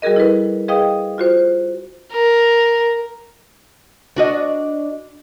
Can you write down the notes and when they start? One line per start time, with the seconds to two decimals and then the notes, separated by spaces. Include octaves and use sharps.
0.02 G3 F#4 G#4 A#4 D#5
0.16 E4 A4 B4
0.68 G#4 B4 D#5 F5 G5 D#6
1.18 F4 F#4 C5
2.12 A#4
4.16 D4 F#4 D#5